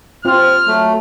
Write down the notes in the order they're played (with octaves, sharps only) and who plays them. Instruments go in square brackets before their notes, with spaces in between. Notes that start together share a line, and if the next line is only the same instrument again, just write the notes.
[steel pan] C4 F4 [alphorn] C5 [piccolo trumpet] F6
[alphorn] F#3 [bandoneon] A3